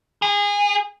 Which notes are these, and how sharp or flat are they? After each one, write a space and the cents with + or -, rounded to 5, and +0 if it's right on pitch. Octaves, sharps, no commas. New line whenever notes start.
G#4 -25